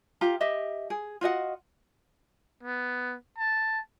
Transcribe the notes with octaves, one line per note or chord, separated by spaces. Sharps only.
F4 G4 A#5
G4 D#5 E5
G#4
F4 F#4 D#5 F#5
B3
A5